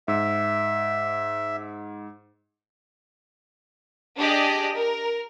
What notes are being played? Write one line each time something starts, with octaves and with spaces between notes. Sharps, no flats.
G#2 E5
D4 G4 G#4 D5 D#5
A#4